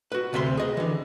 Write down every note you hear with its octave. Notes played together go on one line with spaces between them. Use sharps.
F#4 B4
D2 C3 B4 E5 C6
G#4 D#5
D3 E3